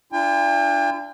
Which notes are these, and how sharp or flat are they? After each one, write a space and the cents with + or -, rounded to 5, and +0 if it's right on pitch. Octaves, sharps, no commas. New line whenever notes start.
D4 +0 F4 -45 G5 +40